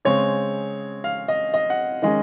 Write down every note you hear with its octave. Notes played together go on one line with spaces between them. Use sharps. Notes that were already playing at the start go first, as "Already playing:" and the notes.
C#3 G#3 C4 C#5
F5
D#5
D#5
F#5
D#3 G#3 C#4 D#5